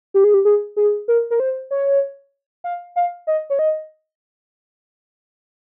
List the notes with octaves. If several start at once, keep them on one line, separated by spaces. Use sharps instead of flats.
G4
G#4
G4
G#4
G#4
A#4
A#4
C5
C#5
F5
F5
D#5
C#5
D#5